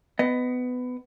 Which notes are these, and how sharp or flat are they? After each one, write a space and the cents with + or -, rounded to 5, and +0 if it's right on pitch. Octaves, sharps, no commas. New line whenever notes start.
B3 +20 D#5 +0